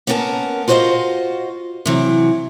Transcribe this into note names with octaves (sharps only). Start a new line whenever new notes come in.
A#3 B3 C#4 A#4 G5 A5
F4 F#4 C5 C#5 D#5 F5
C3 E3 F#3